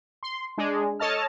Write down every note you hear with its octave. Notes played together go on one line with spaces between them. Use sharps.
C6
G#3 D4 G#4
A4 C#5 D#5 A5 F6